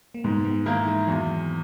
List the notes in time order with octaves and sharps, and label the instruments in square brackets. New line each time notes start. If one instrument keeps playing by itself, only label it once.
[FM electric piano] A#3
[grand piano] G#2 [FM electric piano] G#3 B3
[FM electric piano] G#3 B3
[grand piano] D#3 A#3 E4 A#4
[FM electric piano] E3 G#3
[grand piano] E2 [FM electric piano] D#3 F#3